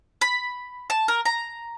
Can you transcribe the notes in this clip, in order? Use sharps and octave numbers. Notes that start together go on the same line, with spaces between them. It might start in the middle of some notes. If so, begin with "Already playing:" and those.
B5
A5
A#4
A#5